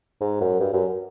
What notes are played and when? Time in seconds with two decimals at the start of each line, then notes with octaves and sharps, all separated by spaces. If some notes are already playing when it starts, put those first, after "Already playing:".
0.21 G#2
0.41 F#2
0.60 G2
0.73 F#2